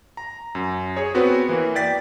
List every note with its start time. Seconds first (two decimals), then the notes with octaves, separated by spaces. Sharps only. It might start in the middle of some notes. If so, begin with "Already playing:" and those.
0.17 A#5
0.55 F#2
0.97 G#4 C#5
1.14 B3 C4 F#4 B4
1.49 E3 A#3
1.75 D5 G5 A6 B6